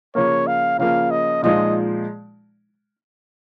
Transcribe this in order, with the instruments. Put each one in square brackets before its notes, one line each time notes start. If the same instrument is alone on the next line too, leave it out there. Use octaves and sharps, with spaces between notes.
[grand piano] C#3 F3 A#3 [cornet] C#5
[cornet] F5
[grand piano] C#3 F3 A#3 [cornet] F5
[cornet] D#5
[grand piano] A#2 F3 G#3 D#4 [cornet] D#5